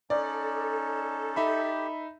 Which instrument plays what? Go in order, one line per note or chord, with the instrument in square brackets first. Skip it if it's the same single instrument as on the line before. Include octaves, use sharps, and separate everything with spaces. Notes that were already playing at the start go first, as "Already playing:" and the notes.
[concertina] C#4 D#4 [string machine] A4 [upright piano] D5
[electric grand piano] D#4 E5 B5 [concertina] G4